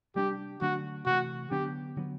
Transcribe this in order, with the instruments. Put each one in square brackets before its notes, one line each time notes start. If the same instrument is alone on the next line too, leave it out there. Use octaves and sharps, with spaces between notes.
[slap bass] C3 G3 B3 D4 [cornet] G4
[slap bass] D3 F#3 A3 D4 [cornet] F#4
[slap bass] C3 E3 A3 [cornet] F#4
[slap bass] D3 F#3 B3 D4 [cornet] G4
[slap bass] D3 F#3 B3